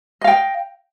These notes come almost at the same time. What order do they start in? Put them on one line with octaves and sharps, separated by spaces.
D#5 F5 G5